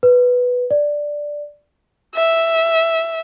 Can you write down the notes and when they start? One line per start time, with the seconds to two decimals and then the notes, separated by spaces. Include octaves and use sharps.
0.03 B4
0.71 D5
2.15 E5